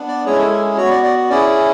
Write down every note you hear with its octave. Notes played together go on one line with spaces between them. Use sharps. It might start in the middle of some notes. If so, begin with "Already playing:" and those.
Already playing: B3 D4
D5
G#3 C#4 E4 G#4 C#5
A4
A4
B3 F#4 C#5
D5
D5
C#4 E4 G#4 D5